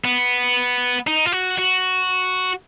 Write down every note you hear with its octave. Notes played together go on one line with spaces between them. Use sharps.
B3
D#4
F4
F#4
F#4